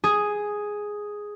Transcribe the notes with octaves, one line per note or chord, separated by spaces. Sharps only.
G#4